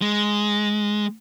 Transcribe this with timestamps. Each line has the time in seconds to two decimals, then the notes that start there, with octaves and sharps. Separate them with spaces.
0.02 G#3